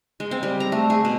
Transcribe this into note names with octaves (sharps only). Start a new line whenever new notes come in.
G#3
C4
G3
A#5
A3
G#4
B2